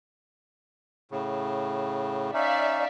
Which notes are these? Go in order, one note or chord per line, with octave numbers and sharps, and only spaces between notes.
A2 C#3
C#4 D#4 D5 E5 F5